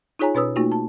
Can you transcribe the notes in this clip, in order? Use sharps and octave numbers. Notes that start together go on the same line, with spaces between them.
D#4 F4 G#4 C#5 G#5 A#5
B2 C#4 B4 C#5 D#6 E6
A3 A#3 D#4 F4 F#4
A5